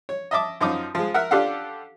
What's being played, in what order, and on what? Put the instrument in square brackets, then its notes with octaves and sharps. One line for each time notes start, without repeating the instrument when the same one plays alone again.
[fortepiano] C#5
D#5 E5 A5 D6
F#2 F3 D#4 D6 D#6
F3 G#3
A#4 E5 F#5
D4 F4 G4 A4 F5 F#5